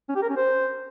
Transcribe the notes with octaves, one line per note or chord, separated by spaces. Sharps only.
C#4
G4
A#4
C#4
C5